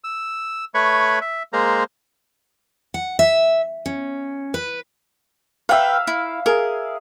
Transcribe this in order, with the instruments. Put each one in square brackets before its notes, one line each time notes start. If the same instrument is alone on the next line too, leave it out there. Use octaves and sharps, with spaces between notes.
[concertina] E6
A3 B4 C#5 B5 C#6
E5
G#3 A#3 C5 A#5
[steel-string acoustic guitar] F#5
E5
C#4
B4
[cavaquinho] B4 G5 [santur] E5 F5
[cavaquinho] E4
[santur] G#4 [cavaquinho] A#4